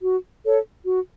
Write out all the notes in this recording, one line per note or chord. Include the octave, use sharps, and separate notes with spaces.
F#4
A4 C#5
F#4